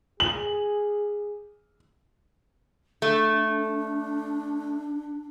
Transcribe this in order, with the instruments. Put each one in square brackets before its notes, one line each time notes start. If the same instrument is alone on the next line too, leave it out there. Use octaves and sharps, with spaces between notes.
[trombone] G#4 [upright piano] F#7
[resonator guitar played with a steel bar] A3 [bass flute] D4